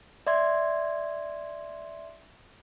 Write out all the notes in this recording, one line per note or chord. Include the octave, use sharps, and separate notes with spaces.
D5 E5 C6 G#6